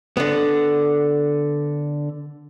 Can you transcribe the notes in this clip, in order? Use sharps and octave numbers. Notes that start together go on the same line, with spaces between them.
D3 B3